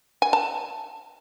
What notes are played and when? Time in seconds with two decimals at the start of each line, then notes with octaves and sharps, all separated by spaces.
0.22 G#5
0.33 A5